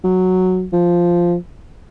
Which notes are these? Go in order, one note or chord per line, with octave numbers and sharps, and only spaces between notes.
F#3
F3